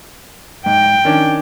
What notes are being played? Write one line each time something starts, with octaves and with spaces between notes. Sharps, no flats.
G#2 G5
D#3 C#4 D4